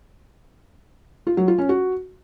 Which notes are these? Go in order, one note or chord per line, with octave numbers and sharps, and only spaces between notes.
F4
F#3
F4
C#4
F#4